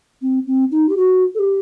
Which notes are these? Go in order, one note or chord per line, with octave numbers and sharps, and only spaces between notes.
C4
C4
D#4
G4
F#4
A4
G4